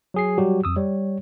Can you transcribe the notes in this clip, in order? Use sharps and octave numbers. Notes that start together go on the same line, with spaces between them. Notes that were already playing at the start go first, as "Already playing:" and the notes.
F#3 G#4 C7
F#3 G3 F#4 G4
F2 D#6 E6
G3 C#5